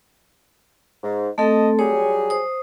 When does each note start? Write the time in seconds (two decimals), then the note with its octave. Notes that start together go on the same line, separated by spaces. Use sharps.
1.04 G#2
1.38 A3 C4 A4 D#5 A5
1.79 F#3 G3 G#4 C#5
2.30 C5 D#6